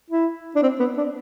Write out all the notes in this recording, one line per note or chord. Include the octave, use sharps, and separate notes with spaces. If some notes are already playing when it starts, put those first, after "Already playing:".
E4
D4
C4
B3
D4